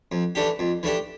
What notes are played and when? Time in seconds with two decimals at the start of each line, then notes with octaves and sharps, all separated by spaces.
0.12 F2
0.35 E3 A3 D4 G4
0.59 F2
0.83 E3 A3 D4 G4